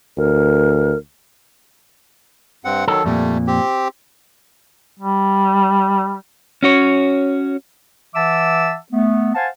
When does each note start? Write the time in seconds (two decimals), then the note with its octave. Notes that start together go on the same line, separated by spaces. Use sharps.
0.18 D2 A#4
2.65 G2 C4 F#5
2.88 D#3 F#3 A4
3.05 F2 A#2 G3 A3
3.47 C4 G4
4.99 G3
6.63 C#4 F#4 C#5
8.15 E3 E5 F#5 A5 D6 E6
8.93 A3 B3
9.35 C5 F5 F#5 G#5 A5